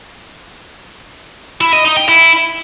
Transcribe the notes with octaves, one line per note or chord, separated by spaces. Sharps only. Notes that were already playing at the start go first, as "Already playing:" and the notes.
E4
D#5
D#4
G5
E4